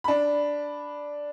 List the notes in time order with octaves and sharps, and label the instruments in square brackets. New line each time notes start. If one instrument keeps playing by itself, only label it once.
[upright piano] D4 B5